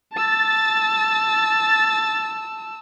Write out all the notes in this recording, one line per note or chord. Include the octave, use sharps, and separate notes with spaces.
A5 E6 A6